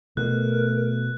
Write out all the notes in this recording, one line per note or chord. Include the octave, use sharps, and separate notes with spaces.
B2 A3 A#4 F#6